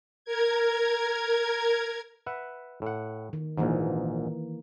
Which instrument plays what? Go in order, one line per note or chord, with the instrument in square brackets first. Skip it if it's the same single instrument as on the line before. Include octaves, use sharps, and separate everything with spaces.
[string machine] A#4 G#6
[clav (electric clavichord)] B4 E5 F#5
A2 F#5
[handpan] D#3
[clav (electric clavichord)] A#1 G#2 [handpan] D#3 E3 A#3